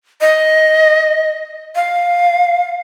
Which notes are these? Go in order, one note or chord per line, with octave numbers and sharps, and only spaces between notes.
D#5
F5